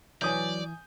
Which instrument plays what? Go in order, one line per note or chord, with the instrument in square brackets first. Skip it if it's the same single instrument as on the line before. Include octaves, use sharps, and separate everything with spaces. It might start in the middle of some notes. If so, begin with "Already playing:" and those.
[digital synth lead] E3 [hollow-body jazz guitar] F#3 B4 C#5 [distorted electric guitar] D5 [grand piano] G#5 D#6 G6